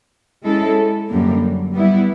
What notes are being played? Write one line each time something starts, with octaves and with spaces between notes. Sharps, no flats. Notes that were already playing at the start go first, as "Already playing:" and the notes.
G#3 C#4 E4 A4
F#2 D3 G3 A#3
G3 B3 E4